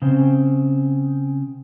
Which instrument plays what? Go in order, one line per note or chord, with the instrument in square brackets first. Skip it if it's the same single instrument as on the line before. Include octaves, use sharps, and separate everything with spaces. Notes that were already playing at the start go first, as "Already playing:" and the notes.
[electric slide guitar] C#3 C4